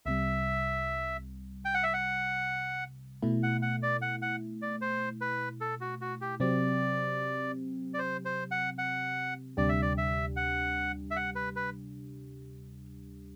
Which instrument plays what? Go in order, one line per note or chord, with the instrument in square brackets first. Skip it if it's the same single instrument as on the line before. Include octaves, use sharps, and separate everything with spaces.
[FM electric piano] C2 C3 G3 [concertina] E5
[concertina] G5
F#5
E5
F#5
[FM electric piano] B2 A3 E4
[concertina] F#5
F#5
D5
F#5
F#5
D5
C5
B4
A4
F#4
F#4
G4
[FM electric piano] C3 F#3 C4 G4 [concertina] D5
[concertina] D5
C5
C5
F#5
F#5
[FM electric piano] D2 C3 G3 D4 G4 [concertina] D5
[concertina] E5
D5
E5
F#5
E5
F#5
B4
B4